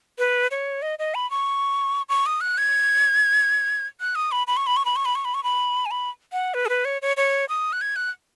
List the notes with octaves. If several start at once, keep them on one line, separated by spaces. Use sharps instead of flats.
B4
C#5
D#5
D#5
B5
C#6
C#6
D#6
F#6
G#6
F#6
D#6
B5
B5
C#6
B5
C#6
B5
C#6
B5
C#6
B5
C#6
B5
G#5
B5
F#5
B4
G#4
B4
C#5
C#5
C#5
D#6
F#6
G#6
F#6